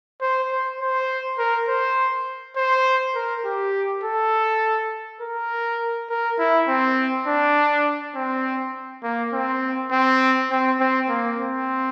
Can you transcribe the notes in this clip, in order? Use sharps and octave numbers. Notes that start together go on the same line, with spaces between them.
C5
C5
C5
A#4
C5
C5
A#4
G4
A4
A#4
A#4
E4
C4
D4
C4
A#3
C4
C4
C4
C4
A#3
C4